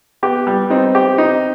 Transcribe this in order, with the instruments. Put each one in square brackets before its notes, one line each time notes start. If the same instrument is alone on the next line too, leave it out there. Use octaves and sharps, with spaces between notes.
[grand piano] B3 [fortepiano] G4
[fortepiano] G3
[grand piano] C4 [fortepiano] D#4
[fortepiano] G4
D#4